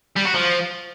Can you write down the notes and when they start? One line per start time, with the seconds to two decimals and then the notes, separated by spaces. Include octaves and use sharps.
0.17 G3
0.25 F#4
0.34 F3